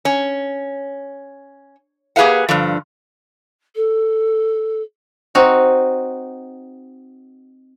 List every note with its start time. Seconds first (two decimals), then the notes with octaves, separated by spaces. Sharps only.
0.05 C#4
2.16 A#3 G4 G#4 B4 F5 F#5
2.49 G2 D3 F3
3.76 A4
5.35 C4 D#4 F#4